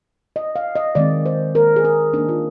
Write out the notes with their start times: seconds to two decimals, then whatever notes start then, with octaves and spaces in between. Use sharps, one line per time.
0.36 D#5
0.56 F5
0.76 D#5
0.95 D#3 G#3 C4 D5
1.26 C5
1.55 A#4
1.76 G#4
1.85 A#4
2.13 D#3 A#3 D4 D#4
2.29 F4